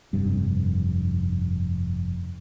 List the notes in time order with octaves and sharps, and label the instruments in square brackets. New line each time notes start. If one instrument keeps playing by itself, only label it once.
[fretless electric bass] F1 G2